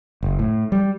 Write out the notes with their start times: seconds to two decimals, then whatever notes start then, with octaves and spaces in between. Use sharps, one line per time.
0.23 F#1
0.39 A2
0.72 G3